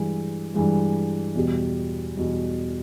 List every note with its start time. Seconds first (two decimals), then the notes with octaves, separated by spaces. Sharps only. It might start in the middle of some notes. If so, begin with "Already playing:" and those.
Already playing: G2 E3 G#3
0.54 G2 E3 G#3
1.35 E2 B2 G3
2.17 E2 B2 G3